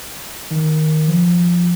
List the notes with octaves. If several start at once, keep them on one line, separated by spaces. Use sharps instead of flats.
D#3
F3